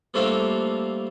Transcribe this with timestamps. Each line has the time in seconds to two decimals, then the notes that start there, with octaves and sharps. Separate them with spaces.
0.14 G3 A3 A#3 C4 D4 F4